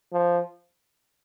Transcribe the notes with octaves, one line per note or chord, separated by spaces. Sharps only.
F3